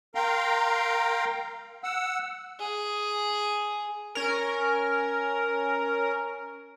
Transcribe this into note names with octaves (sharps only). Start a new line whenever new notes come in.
A#4 F5 G5 A#5 C6
F#5 E6
G#4
C#4 A#4